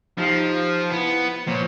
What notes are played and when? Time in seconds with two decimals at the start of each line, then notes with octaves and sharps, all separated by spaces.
0.18 F3 D#4 G4 F5
0.92 B3 E4
1.47 A#2 F3 C5 C#5